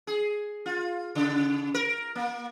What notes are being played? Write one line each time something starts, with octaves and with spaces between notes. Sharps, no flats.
G#4
F4
C#3
A#4
A#3